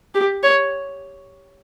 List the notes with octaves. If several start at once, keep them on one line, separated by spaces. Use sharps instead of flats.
G4
C#5